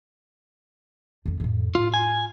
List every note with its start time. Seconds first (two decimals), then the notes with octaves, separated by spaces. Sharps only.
1.26 F2 B3
1.40 F2 A2
1.75 A2 F4
1.94 G#5